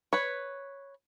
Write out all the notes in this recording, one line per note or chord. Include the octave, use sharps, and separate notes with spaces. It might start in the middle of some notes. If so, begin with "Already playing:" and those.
B4 C#5